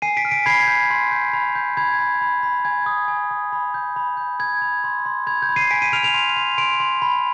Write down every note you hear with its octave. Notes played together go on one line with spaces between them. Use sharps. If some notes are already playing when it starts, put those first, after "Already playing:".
G#5 C7 D#7
B6 D7
F6
B6 D7
B5 G#6 C7
G6
C6
G6
B5
G6
B5 G#6
B5
B5
B5
G#5 G#6
D#6
G#5
D#6
B5
G6
B5
G6
B5 G#6
B5
C6
C6
B5 G#6
G6
B5
C7 D#7
G#5 B6 D7
C7 D#7
F6 D7 F7
D7 F7
C6
C6
C6 D7 F7
C6
B5